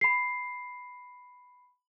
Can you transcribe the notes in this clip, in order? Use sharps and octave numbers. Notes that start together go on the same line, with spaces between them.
B5 C7